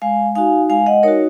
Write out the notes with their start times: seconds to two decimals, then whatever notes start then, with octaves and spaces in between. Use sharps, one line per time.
0.02 G#3 F5 G#5
0.35 D#4 F#4 F5 G#5
0.69 G#3 F5 G#5
0.86 D#5 F#5
1.03 D#4 F#4 A#4 C#5